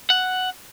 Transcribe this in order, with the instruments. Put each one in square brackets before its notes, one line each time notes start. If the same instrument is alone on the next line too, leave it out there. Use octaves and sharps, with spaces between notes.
[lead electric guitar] F#5